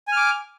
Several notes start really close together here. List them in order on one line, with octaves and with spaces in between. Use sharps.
G#5 F6 D6